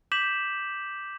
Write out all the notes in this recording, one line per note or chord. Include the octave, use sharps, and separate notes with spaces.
D6 G6 B6 E7 F#7